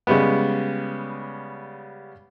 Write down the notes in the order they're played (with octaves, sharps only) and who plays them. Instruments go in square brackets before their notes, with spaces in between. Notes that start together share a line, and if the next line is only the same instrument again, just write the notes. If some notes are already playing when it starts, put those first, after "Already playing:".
[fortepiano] C#3 G3 G#3 B3